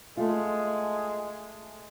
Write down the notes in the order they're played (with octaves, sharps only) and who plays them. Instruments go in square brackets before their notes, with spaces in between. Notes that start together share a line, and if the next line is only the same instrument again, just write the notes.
[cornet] G#3 [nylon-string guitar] A3 F4